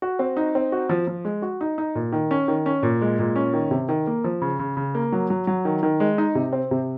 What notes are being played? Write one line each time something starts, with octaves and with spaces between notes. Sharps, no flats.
F#4
C4
D#4
C4
F#4
F3
F3
G#3
F#4
D#4
D#4
A#2
D#3
C#4
D#3
C#4
A#2
G#3
A#2
C#4
D#3
C3
D#3
A#3
F3
C#3
C#3
C#3
A#3
F#3
F#3
F#3
D#3
D#3
G#3
D#4
C3
C4
C3